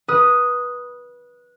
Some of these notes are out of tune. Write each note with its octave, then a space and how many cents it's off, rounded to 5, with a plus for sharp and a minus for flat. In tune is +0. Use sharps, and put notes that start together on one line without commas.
B4 -20 D#6 +0